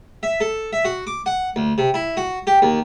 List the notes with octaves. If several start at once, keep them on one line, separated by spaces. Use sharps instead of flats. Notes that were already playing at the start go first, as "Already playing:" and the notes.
E5
A4
E5
F#4
D6
F#5
D2
C3
E4
F#4
G4
D#2